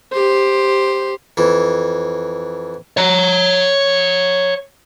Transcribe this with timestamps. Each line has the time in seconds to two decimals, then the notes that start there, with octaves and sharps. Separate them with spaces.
0.13 G4 C5
1.37 F2 E3
2.97 C#5 A#5